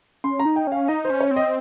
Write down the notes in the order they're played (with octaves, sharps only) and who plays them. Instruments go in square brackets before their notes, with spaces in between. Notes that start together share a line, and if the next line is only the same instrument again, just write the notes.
[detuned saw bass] C#4 [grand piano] C6
[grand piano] A#5
[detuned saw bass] D#4
[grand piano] G5
[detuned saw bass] C#4 [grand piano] F5
[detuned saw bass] D#4 [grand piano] D#5
[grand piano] C5
[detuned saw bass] C#4
[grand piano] C#5
[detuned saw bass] C4
[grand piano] D#5